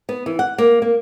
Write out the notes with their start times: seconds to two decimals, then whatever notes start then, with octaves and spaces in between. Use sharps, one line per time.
0.09 B3
0.26 E3
0.39 F#5
0.58 A#3
0.82 A#3